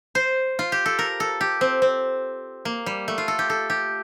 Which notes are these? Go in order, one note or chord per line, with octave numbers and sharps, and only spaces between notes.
C5
F4
G4
A4
A#4
A4
G4
C4
C4
A#3
G3
A3
F4
A4
G4
A4
G4